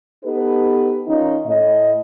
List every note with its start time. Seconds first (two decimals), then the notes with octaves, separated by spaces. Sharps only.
0.24 B3 D#4 G4 A4 B4
1.07 D#3 C#4 D#4 F4
1.46 A2 D#5